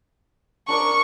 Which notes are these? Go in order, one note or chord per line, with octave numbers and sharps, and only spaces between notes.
D4 A#4 D5 C#6